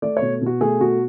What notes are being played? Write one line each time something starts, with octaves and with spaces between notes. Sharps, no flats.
A3 D5
C#5
B2
B2 F#4
A3 G#4
B2 F#4